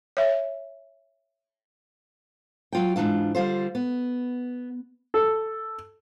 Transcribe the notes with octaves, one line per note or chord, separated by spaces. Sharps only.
C#5 E5
F#3 F4 G5
G#2 D#3 E3 D4 F4
D3 G3 F4 C5
B3
A4